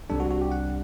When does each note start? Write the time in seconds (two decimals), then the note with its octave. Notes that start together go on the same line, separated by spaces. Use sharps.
0.10 C2 C3 G3 D4 A4
0.20 F#4
0.31 F#4
0.41 G4
0.52 F#5